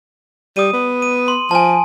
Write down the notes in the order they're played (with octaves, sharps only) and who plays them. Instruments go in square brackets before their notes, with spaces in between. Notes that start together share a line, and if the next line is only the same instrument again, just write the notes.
[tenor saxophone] G3 [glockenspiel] D#6 D#7
[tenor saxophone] B3
[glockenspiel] D#7
C6
[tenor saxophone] F3 [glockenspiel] G#5 A5